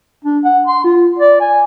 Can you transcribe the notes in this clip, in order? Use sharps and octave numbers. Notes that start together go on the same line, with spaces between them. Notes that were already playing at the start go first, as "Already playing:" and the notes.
D4
F#5
C6
F4
D5
G#5